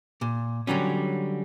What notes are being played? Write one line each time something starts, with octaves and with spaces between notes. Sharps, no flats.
A#2
D3 F#3 G3 C#4